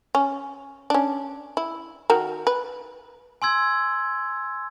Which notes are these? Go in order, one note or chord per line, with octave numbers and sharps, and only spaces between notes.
C#4
C#4 D4
E4
D#3 F#4 A#4
B4
G#5 C6 E6 G#6